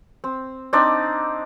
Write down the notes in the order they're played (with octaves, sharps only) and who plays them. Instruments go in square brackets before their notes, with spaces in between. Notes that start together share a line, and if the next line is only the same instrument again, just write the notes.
[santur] C4
C4 D4 D#4 D5